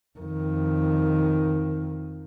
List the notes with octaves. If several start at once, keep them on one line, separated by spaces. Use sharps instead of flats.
F2 D#3